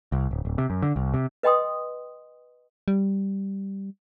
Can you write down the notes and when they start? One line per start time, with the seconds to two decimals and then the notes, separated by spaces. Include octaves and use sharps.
0.12 C2
0.31 D1
0.45 D1
0.58 C3
0.70 F#2
0.83 D3
0.96 C2
1.14 C3
1.43 B4 D#5 G5 C6 D#6
2.88 G3